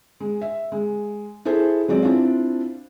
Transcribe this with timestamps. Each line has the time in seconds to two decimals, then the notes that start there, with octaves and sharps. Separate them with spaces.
0.20 G#3
0.42 E5
0.72 G#3
1.45 E4 G#4 A4 C5
1.88 F#3 G#3 C4 D5
2.03 C4 D4 E4 F4